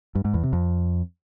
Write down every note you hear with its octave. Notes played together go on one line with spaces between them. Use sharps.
G2
G#2
E2
C3
F2